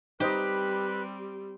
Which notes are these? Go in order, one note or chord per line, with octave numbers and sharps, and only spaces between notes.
G3 C4 D#4 G4 B4 C5 D#5